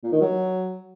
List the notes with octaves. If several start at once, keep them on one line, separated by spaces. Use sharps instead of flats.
A#2
D#3
F#3